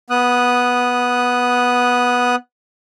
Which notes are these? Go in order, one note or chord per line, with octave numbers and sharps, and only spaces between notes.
B3 D#6 F#6